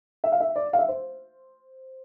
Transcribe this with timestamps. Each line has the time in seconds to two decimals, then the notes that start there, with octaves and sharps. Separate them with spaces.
0.24 E5
0.32 F5
0.40 E5
0.56 D5
0.73 F5
0.78 E5
0.88 C5